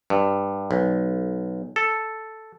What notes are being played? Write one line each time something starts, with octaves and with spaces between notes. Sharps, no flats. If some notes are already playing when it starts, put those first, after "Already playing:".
G2
B1
A4